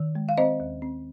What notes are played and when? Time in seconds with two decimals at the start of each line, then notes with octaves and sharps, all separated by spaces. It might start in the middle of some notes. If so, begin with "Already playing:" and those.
Already playing: D#3
0.15 G#3
0.29 F5
0.38 C4 C5 D#5
0.60 D#2
0.82 C4